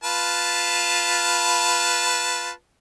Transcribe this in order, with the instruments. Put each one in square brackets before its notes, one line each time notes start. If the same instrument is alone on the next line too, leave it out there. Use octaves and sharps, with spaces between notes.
[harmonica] F4 B4 A5